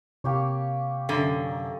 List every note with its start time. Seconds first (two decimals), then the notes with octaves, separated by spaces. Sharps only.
0.24 C3 A#3 G4 C#5
1.09 F#2 D3